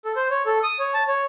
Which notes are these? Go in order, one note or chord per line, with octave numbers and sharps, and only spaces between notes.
A4
C5
C#5
A4
D#6
C#5
A5
C#5